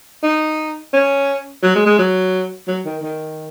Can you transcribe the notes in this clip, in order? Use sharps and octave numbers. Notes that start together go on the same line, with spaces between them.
D#4
C#4
F#3
G#3
G#3
F#3
F#3
D#3
D#3